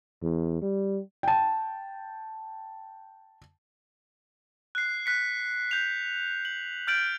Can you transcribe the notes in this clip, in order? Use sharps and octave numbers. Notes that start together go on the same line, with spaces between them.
E2
G3
G5 A5
F#6 C7
F#6 B6 C#7
G6 F7
F#7
F6 G6 A6 D7 F#7